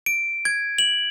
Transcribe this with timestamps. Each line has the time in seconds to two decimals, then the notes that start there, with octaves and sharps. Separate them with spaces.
0.06 D7
0.45 G#6
0.78 F#7